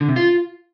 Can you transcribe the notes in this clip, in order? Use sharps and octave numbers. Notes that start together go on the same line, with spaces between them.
D3
C3
F4